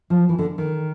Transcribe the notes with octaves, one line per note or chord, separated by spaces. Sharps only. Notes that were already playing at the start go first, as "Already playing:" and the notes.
F3
E3
D3
D#3